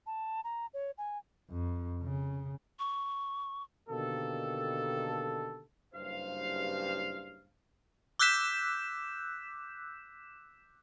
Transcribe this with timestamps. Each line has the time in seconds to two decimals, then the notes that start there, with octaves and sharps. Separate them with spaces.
0.06 A5
0.44 A#5
0.74 C#5
0.98 G#5
1.50 F2
2.02 C#3
2.79 C#6
3.89 B2 D3 D#3 A#3 G4 A4
5.94 F#1 G2 C5 F5
8.19 D6 E6 F#6 G6 B6 E7